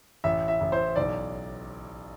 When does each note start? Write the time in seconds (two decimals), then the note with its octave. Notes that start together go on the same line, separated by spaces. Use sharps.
0.24 A1 E5
0.48 E5
0.61 A1
0.72 C5
0.96 B1 D5